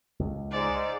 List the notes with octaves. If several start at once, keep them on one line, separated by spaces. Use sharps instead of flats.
C#2
G#2 D5